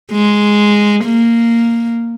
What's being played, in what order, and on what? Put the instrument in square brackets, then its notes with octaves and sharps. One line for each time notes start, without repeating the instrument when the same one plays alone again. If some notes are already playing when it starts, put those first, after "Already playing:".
[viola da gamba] G#3
A#3